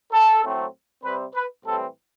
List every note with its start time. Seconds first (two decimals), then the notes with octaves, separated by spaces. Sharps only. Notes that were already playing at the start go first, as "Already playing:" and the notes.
0.13 A4
0.43 A2 F#3 A3 C4
1.04 C3 G3 C4 B4
1.35 B4
1.64 A2 E3 G3 C4 A4